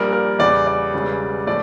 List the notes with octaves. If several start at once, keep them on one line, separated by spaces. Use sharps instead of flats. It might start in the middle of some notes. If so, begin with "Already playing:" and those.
Already playing: A#1 A#2 G3 A#4
A#4
E2 C#3 G3 D5
D5
E1 E2 C#3 G3
A2 F3 D5